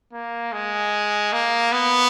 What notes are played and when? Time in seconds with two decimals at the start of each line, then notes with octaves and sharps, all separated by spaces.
0.13 A#3
0.52 G#3
1.32 A#3
1.72 B3